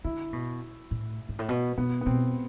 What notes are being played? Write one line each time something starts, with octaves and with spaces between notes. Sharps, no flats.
D3 E4
B2
A2
G#2
A2
B2
B2 B3
B3
B2 C4